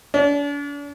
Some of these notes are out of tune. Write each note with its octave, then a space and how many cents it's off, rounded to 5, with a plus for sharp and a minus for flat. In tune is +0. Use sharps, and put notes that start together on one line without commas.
D4 -40